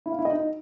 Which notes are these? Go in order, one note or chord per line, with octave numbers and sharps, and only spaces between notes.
E4
F5
E4
D#5
D#4